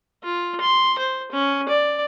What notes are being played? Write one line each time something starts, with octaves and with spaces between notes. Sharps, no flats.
F4
C6
C5
C#4
D5